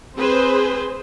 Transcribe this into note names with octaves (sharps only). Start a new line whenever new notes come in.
C4 G#4 B4 C5